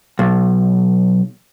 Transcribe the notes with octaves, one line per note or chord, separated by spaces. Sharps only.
B1